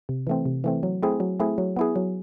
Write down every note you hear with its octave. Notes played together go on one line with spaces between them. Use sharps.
C3
E3 A3 C4
C3
E3 A3 C4
F#3
A3 C4 E4 G#4
F#3
A3 C4 E4 G#4
F#3
B3 E4 G#4
F#3